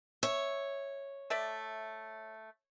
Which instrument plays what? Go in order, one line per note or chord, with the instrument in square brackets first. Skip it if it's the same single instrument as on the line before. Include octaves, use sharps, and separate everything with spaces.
[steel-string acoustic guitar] C#5 [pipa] E5
[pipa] A3 D5 E5